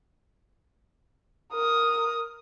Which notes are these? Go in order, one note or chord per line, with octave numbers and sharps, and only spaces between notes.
A#4 D#6